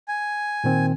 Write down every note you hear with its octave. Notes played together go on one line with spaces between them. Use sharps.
G#5
A#2 D#3 C4